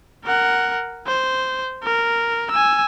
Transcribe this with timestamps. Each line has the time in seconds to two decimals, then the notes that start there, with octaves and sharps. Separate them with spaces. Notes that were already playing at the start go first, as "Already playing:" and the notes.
0.25 A#4 F#5
1.07 C5
1.83 A#4
2.51 G#5 E6